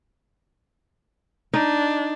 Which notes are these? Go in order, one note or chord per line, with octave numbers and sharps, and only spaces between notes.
D4 D#4